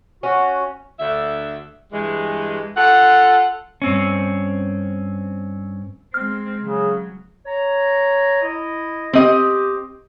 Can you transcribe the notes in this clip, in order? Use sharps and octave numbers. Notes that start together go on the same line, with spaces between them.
C#4 F#4
D2 D3 E5
G2 E3 G#3
F4 A4 F#5
G2 C4 C#4
G#3 C4 F6
C#3 F#3
C#5 A#5
E4 D#5
C4 G4 D#5